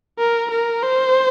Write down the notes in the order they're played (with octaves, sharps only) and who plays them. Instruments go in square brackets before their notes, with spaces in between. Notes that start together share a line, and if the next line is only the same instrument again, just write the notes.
[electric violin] A#4
A#4
C5